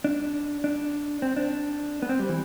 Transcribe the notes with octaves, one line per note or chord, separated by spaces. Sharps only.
D4
D4
C4
D4
B3
C4
G3
E3